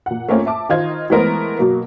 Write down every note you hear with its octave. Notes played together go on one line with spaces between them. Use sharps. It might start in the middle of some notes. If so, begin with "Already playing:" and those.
A#2 F#5
A3 A#3 C4 C#4 F4
E5 A5 D6
D#3 D#4 F4 C5 G#6
E3 G#3 A3 B3 A#4 C5
B2 F#3 A#3